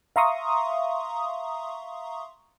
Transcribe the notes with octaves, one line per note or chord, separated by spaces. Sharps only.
E5 F5 A#5 C6 C#6 D#6